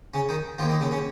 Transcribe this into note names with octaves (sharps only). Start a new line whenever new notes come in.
C#3 C#4
D#3 D#4
D#2 D#3 F3 A#3 F4
D#3 D#4
C#3 C#4
C#3 C#4